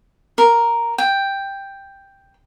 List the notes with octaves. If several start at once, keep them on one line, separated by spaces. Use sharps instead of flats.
A#4
G5